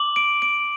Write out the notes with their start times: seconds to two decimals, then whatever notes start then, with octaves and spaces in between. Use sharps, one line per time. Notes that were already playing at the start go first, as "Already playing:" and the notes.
Already playing: D6 F#7
0.16 D7
0.42 D7